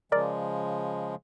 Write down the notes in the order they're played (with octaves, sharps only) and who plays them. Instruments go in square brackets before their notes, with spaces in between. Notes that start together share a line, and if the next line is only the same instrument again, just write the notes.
[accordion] C#3 F3 G#3 [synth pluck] A#4 D5